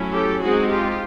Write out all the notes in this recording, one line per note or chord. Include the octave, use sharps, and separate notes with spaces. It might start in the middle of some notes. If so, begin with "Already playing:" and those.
Already playing: F#3 A3 C#4 E4
G4 A4
G#3 C4 D#4 F#4 G#4
F4 G4